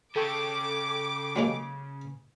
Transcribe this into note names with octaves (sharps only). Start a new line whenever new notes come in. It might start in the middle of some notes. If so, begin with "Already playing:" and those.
C#3 A4 G5 C#6 D6
F#3 G#3 A#3